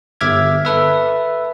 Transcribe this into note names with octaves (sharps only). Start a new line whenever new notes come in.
G1 E5 D6 F6 G#6
A4 B4 E5